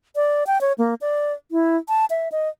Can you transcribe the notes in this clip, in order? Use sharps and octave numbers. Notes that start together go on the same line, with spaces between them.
D5
G5
C#5
A#3
D5
E4
A5
E5
D#5